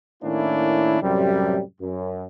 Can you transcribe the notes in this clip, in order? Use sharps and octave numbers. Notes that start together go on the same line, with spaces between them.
A2 D#3 A#3 C#4 D4 E4
F#2 A2 C3 G3
F#2